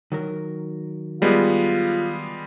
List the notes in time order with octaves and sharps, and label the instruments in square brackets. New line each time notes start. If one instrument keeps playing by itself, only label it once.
[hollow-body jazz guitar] D#3 F#3 A#4
[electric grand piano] G3 G#3 B3 [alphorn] F4